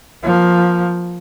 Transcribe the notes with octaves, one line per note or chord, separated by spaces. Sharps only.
F3 A#3